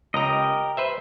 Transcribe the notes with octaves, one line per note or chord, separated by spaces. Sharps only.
C#2 G4 A#4 D#5 A#5
B4 C5 E5